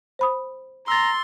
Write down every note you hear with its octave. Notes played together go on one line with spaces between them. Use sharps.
C5 B5 D#6
A#5 C6 E6 A6